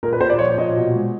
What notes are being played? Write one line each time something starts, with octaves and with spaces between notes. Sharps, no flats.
A#2 A#4
B4
A#2 C5
D5
F3 C#5
A#2 D#5
B2
G#3